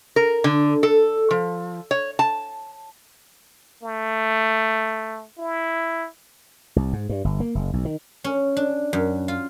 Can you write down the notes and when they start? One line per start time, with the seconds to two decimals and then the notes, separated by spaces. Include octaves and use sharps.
0.16 A#4
0.44 D3
0.83 A4
1.31 F3
1.91 C#5
2.19 A5
3.83 A3
5.38 E4
6.76 C2
6.93 G#2
7.09 G2
7.25 G1
7.40 A#3
7.55 F#1
7.73 B1
7.85 D#3
8.24 C#4
8.57 D4
8.93 F#2
9.28 F4